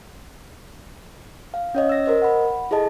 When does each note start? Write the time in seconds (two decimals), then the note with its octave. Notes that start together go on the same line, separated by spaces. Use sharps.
1.54 F5
1.75 C#4 C#5 D#5
1.89 E6 A#6
2.06 A#4 C5 D#5
2.22 F#5 B5
2.71 E4 G#4 A4 D#5 A5